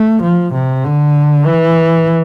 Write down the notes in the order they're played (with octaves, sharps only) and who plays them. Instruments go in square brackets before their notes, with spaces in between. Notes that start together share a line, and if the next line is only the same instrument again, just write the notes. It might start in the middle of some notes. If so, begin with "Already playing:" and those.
Already playing: [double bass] A3
F3
C3
D3
E3